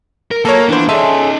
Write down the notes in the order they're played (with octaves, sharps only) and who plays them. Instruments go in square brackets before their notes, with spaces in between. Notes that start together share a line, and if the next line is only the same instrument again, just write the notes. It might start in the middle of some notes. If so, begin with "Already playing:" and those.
[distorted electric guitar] A#4
[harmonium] F#3 [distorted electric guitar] A#3 [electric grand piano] A4 A#4 C#5
[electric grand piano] E3 C5 [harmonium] F3 B3 [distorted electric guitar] D4
[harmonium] C#4 G#4 A4 [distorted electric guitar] D#4 D5 [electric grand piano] E5 A5 C6